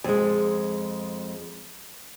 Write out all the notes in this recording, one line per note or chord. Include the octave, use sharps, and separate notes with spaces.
F2 G#3